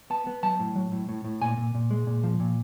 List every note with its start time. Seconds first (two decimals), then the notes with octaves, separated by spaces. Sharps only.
0.10 B3 A5
0.27 B3
0.43 F#3 A5
0.60 A2
0.76 F#3
0.92 A2
1.09 A2
1.25 A2
1.41 A#2 G#5
1.57 A#2
1.75 A#2
1.91 G#3
2.07 A#2
2.23 F3
2.40 A#2